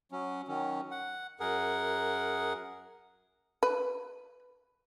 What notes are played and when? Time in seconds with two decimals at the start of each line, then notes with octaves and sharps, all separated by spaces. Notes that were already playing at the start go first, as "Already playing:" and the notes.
0.12 F#3 C#4
0.48 D#3 F#3 C#4
0.91 F#5
1.40 F#2 G#4 A#4 F#5
3.63 B4